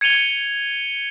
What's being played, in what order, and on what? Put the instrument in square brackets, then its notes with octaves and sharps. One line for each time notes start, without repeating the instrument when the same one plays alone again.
[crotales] G#6 C#7 D#7 F7 G7